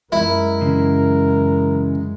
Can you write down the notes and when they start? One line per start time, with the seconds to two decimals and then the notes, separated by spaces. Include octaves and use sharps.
0.12 F#2 G#3 E4 A#4
0.62 C#3 E3